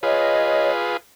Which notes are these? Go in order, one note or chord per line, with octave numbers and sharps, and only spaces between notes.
F4 G#4 B4 C#5 D#5